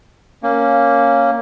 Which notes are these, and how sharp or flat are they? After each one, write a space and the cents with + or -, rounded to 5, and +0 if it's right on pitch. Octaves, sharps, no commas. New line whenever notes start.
A#3 +0 C#4 +0